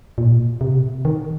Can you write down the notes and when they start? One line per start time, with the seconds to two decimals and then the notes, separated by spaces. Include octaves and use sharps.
0.18 A#2
0.61 C3
1.05 D#3